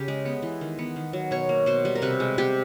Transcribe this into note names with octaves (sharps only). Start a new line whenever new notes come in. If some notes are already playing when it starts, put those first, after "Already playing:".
Already playing: C#3 G4
G#3
B3
E3
D#3
B3
D#3
F#3
B2 C#5
A#3
B2 C5
G3
A#4
C3 B4
G#3
C3 G4